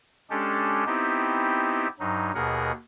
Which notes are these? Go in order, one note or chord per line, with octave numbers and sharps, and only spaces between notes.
G#3 C#4 D4 G4 A4
B3 C4 D#4 E4 G4
G2 F#3 D#4
D#2 B2 G#4 A#4 F#5